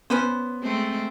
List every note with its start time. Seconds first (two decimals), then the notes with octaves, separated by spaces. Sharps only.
0.10 B3 C#4 B4 C5
0.63 G#3 A3 C4